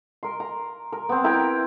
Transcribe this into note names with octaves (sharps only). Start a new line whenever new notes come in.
A#4 C6
A#5
A#4
B3 C4
E4 A#4 G5